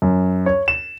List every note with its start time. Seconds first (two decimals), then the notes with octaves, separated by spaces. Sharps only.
0.02 F#2
0.46 C#5
0.68 E7